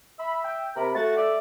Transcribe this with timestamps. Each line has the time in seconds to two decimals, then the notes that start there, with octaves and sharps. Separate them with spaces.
0.19 E5 B5
0.44 G5
0.76 C3 A#4 B5
0.95 A3 F#4 A6
1.17 D5 E5